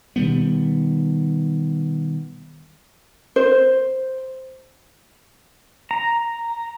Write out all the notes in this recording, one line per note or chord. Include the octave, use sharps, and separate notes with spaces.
B2 D#3 G3 B3
C5
A#5